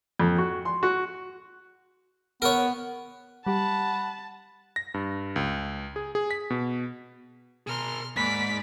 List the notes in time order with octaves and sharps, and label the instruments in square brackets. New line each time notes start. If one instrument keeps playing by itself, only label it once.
[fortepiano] F2
F#4
C6
F#4
[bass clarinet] B3 [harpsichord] A#4 C#5
[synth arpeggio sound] G3 G4 [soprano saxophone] F#5 [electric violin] A5 [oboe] B5
[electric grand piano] A#6
G2
C#2
G#4
G#4
B6
B2
[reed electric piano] B2 [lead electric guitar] G#4 A#4 [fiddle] C6 F6
[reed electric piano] D#2 A#3 B5 [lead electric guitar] G#2 [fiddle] D5 [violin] B6